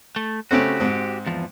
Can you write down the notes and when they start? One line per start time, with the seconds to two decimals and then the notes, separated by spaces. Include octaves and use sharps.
0.16 A3
0.51 C#3 A3 C4 F#4 G4
0.80 G#2 C4
1.26 E2 F3